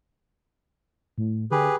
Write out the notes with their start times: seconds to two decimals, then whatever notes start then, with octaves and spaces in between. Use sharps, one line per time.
1.18 A2
1.51 D3 G4 G#4 B4